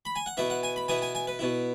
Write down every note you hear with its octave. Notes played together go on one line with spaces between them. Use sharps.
B5
G#5
F#5
B2 B3 E4 E5
F#5
G#5
B5
B2 B3 E4 G#5
G#5
G#5
B4
B2 B3 E4